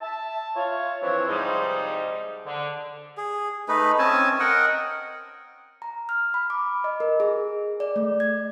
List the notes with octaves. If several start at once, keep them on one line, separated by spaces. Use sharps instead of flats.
E5 A5
F4 C#5
E3 F3 C4 D4 E4 C#5
G#2 C3 F3 G3 G#3 D#4
D3
G#4
A3 D#4 B4
C4 C#4 G#5 A5
A#4 D#5 F#5 G5
A#5
F6
B5
D6
D#5
A#4
G#4
D5
A3
G#6